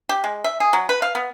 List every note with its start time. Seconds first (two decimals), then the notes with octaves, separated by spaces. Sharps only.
0.09 G4
0.24 G#3
0.44 E5
0.60 G#4
0.73 F#3
0.89 B4
1.02 F5
1.15 B3